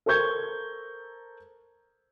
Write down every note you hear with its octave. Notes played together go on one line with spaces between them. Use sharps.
A4 A#4 C5 C#6 G6 G#6